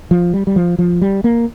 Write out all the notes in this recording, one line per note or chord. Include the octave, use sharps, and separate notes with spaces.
F3
G3
G3
F3
F3
G3
A#3